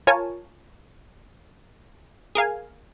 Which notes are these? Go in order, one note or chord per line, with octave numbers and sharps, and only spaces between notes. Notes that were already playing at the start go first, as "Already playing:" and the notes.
F4 A#4 C#5 G#5 A5
G#4 A#4 F5 G#5